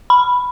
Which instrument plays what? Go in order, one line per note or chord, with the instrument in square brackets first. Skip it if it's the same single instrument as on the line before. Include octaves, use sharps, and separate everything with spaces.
[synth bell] B5